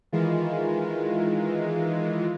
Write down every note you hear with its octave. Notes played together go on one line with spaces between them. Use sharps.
D#3 E3 G#3 F4